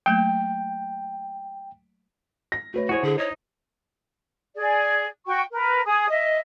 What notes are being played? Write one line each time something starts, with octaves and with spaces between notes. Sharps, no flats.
F#3 A3 A#3 G5
A#6
A3 F#4 B4 C#5
E4 F#4 G#4 C5 C#5
D3 G#4
D#4 C#5 D#5
G#4 D5
F#4 G5 C#6
A#4 B4
G#4 G#5 D#6
D#5 E5